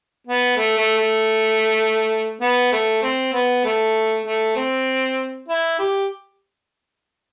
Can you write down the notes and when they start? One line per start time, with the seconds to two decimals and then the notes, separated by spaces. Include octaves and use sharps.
0.27 B3
0.57 A3
0.78 A3
0.98 A3
2.41 B3
2.73 A3
3.03 C4
3.33 B3
3.65 A3
4.26 A3
4.56 C4
5.48 E4
5.79 G4